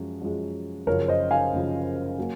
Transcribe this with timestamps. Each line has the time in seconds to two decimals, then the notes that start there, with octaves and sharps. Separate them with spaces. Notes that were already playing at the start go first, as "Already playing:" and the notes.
Already playing: F#2 F3 G#3
0.22 F#2 F3 G#3
0.87 F#1 F#2 C#3 F3 A#4 C#5
1.08 C5 D#5
1.31 F5 G#5
1.53 F#1 F#2 C#3 F3
2.18 F#3 A#3